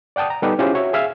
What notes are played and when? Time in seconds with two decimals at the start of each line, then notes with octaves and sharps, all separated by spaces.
0.16 D5 F#5 G5 A5 D#6
0.30 A#5
0.42 G3 B3 D#4 G4 A4 B4
0.59 C#4 E4 F4 G4 G#4 C5
0.74 F#4 C#5 E5
0.93 G#4 E5 F5 G#5